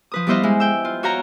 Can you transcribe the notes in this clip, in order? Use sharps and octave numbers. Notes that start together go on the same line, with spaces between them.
F3 B4 D#6
G3 B3 E4 C5 D#5 F5
G#3 E4
G5 E6
F4
F#4 C#5 F5 G5 A#5